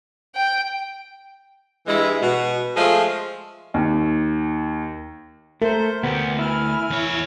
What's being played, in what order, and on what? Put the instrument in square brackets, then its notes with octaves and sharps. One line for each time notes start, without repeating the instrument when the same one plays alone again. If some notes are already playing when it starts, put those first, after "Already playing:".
[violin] G5
[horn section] G2 E3 G#3 E4
B2
F3 G#3 A3 F4
[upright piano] D#2
[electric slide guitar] A3 [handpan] A#4 [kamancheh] C5
[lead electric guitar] D2 [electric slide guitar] B3 [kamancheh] G4
[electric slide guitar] E4 [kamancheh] G#5 F6
[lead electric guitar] E2 C#5